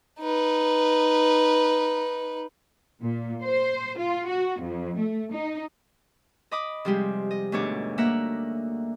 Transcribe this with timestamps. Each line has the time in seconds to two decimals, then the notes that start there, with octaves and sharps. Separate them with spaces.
0.20 D#4 B4
3.02 A#2
3.43 C5
3.98 F4
4.27 F#4
4.61 F2
4.98 A3
5.32 D#4
6.51 D#5 B5 D6 D#6
6.85 C3 F3 G3 G#3 G4 G#4
7.31 D#5
7.52 D2 G#2 B2 D4 C#5 D6
7.98 A#3 E5 F#5 A#5